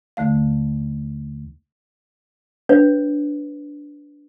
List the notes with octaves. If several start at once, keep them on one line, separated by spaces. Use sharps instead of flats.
D#2 D3 A3 F5
D4 B4 C#5